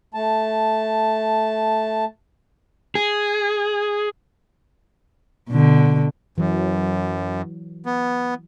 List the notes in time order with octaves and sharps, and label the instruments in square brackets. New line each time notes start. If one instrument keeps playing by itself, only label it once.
[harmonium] A3 A5
[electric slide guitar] G#4
[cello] B2 D3
[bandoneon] F#2 [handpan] E3 F#3
[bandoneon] B3